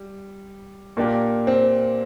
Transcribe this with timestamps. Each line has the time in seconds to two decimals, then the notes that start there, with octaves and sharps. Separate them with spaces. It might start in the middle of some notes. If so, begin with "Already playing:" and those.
Already playing: G3
0.97 A#2 A#3 D4 G4
1.47 C4